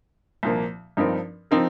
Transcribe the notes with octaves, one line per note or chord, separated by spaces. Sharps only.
C2 A#2 F3 A#3
G2 F3 C4 D#4 A#4
F3 C4 D#4 A#4